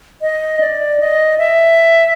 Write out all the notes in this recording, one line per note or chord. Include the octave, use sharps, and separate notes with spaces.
D#5
D5
D#5
E5